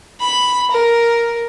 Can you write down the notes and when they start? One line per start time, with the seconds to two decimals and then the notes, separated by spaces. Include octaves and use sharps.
0.20 B5
0.71 A#4